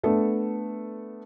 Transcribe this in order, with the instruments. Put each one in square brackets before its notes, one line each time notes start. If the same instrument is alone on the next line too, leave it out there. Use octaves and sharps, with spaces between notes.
[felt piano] A3 B3 D4 A4